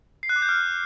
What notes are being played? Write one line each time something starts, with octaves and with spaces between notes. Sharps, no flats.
C7
F#6
D6
G6
F6